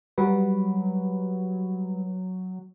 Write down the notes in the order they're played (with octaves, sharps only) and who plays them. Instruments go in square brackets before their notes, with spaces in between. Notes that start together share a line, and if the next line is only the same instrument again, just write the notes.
[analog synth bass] F#3 [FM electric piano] G3 F#4 B4